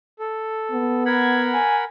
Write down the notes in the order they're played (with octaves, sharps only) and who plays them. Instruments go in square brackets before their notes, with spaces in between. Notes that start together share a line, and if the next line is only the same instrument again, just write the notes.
[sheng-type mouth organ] A4
[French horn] B3
[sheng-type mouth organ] A#4 F#5 B5 [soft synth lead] G#6
[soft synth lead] G#5